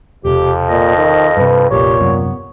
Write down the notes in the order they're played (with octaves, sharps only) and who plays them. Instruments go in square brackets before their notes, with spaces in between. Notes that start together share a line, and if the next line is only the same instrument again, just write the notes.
[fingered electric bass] E1 C3 [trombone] F2 [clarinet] G4
[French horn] A#2 [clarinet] D#5
[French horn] D#3
[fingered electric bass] G2 C3 [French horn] B4
[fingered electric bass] F1 A#1 [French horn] A#2 [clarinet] G4 [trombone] C#5
[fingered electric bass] D#1 F#2 C3 [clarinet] B3